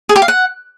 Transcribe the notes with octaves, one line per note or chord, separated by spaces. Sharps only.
G#4
G4
F5
F#5